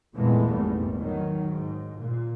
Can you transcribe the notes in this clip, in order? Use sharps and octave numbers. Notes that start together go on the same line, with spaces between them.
F2 A#2 E3 G#3 A3 B3
G#1 E2 G#2 G3
D#3 F#3
G#2
A#2